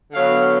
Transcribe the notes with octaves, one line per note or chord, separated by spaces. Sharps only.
D3 F#3 B3 F5